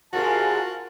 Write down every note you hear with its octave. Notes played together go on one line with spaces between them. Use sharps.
G#2 C3 G#3 F4 F#4 A#4 A5